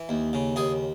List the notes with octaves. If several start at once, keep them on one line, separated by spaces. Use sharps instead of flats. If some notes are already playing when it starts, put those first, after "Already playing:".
Already playing: E3
D#2
C#3
D#2 G#4